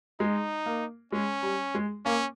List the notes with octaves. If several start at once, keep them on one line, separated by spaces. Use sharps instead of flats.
G#3 D#4
A#3
G#3 C#4
G3
G#3
A#3 C#4